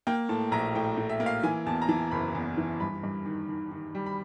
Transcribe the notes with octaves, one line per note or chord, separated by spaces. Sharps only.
A#3 G5
A2 A5
A#1 A#5
A2 G5
A2
E5
A#3
F5
E3 G#5
E2 A5
A#5
E3 A5
F#1 B5
E2
E3
G2 B5
G2
D#3
D#3
D#3
G3
B5